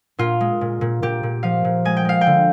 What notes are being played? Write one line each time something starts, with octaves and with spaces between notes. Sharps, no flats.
A#2 F4
G#3
A#2
A#2
A#2 G4
A#2
F3 F5
A#2
G#3 G#5
G5
G#3 F5
G5
D3